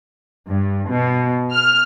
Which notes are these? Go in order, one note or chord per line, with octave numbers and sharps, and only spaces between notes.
G2
B2
F6